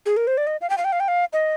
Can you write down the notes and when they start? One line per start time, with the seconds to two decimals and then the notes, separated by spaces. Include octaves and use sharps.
0.06 G#4
0.17 A#4
0.27 C5
0.37 D5
0.47 D#5
0.61 F5
0.70 G5
0.78 F5
0.84 G5
0.92 F5
1.00 G5
1.08 F5
1.33 D#5